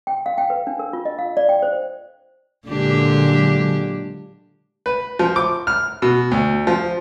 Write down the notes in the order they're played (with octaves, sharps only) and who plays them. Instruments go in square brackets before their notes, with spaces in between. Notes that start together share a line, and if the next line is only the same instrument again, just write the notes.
[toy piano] G5
F5
G5
B4
D4
A#4
F4
D#5
F5
D5
G5
C5
[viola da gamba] A#2 D4 G4 [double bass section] D3 F#3 G#3
[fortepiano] B4
F3
D6
F6
B2
D2
F3